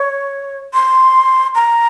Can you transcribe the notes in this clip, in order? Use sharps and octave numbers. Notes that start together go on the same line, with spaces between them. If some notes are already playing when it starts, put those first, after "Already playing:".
Already playing: C#5
C6
A#5